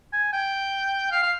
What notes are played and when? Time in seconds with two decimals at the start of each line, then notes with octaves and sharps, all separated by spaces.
0.13 G#5
0.33 G5
1.12 F5
1.23 F5